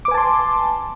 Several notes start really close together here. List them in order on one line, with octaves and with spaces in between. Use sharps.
D6 B4 G#5 A5 C6